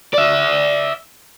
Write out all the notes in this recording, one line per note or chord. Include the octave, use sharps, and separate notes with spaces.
D5 E5